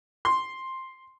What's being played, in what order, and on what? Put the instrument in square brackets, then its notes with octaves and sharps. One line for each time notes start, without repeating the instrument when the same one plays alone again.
[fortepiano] C6